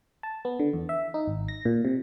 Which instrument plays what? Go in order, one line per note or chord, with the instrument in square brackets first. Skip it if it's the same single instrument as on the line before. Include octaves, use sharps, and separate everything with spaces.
[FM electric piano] A5
B3
D3
E2
E5
D#4
G#1
A#6
A#2
C3